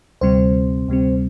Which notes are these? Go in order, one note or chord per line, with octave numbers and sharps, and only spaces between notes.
D2 C3 G3 C4 C5
D2 C3 G3 C4